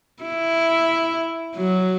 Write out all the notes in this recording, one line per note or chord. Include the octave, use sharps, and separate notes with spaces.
E4
F#3